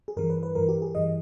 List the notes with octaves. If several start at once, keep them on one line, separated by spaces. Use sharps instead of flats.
G#4
G2 E3 A#4
B4
B4
G2 E3 A#4
G4
G#4
G2 E3 D#5